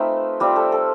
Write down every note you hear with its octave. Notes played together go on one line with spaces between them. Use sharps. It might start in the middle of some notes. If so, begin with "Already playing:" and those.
Already playing: A3 C4 D#4 F4 B4
G3 C4 F4 G4
A4
A4